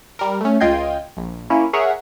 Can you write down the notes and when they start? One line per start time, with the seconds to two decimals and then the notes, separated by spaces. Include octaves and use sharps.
0.19 G3 A#4
0.41 A3 C#4
0.60 C#2 F4 D#5 G5 G#6 C7
1.17 A#1
1.50 A#3 C#4 E4
1.73 G#4 A#4 C#5 E5 F#5